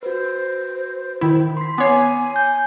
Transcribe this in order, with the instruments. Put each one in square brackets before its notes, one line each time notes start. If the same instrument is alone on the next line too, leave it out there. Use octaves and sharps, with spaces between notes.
[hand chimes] F#4 B4 [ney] C5
[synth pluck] D#3 E4
[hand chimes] C6 B6
[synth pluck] B3 C#5 [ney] G#5 [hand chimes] D6 C7
[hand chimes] G#5 G6